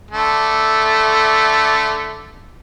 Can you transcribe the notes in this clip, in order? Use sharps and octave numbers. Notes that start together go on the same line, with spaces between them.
D3 A3